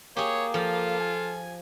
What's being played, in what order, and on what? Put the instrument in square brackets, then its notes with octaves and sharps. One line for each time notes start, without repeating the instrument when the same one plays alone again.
[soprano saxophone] A#3 [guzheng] G4 G#4 [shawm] C#5
[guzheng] F3 [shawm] F4 [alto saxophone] A4
[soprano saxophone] G#5